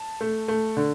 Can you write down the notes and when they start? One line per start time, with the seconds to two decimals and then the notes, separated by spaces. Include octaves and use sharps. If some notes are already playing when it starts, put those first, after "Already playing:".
Already playing: A5
0.21 A3
0.48 A3
0.77 D3